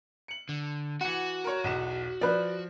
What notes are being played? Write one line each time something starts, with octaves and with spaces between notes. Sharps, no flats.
C#7 F#7
D3
E3 F#4 F#5
A#4 C#5
B1 E2 E7
F3 B4 D5